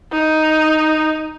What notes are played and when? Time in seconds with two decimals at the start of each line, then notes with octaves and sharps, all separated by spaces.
0.12 D#4